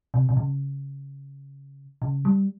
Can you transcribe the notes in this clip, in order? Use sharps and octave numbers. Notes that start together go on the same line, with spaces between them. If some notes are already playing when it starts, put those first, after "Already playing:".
C3
C3
C#3
C#3
G3